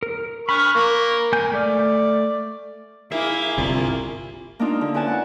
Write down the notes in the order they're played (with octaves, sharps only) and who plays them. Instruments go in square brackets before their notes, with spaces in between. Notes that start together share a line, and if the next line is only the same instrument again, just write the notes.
[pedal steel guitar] A#4
[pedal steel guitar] B5 F#6 [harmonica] C#6 F6
[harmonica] A#3
[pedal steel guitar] A#3 G#5 G6
[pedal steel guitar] A3 F6 [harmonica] D5
[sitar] A#3 [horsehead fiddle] E4 G#4 [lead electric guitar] E5
[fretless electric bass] G1 C2 [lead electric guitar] F4 B5
[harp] A#3 D4 D#4 F4
D3
C#4 E4 F#4 B4 G#5 A5
F#5